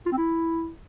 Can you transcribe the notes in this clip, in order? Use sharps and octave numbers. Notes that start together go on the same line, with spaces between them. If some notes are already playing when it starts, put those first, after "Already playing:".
F4
C4
E4